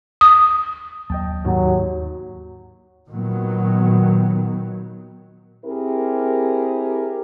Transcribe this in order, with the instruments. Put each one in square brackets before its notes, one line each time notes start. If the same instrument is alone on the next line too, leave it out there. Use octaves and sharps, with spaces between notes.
[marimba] D#6
[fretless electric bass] D#2 F#3 [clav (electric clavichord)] D#5 G5 A5
[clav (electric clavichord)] D#2 [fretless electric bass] G#2 [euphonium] F#3
[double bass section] A#2 D#3 F#3 B3
[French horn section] C4 E4 G4 G#4 A#4